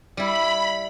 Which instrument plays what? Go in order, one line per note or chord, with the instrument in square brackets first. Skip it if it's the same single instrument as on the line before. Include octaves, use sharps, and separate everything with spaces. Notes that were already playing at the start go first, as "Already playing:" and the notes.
[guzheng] G3 E4 [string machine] B5